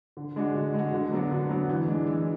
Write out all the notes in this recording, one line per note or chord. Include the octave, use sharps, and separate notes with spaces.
D3
G#3 D4 F#4
D3
G#3 D4 F#4
D3
F#3 B3 D4 F#4
D3
F#3 B3 D4 F#4
E3
G#3 D4
E3